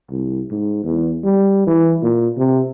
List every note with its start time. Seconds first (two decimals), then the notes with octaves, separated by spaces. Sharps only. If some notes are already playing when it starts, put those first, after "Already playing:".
0.10 C2
0.51 G#2
0.84 E2
1.24 G3
1.67 E3
2.02 A#2
2.37 C3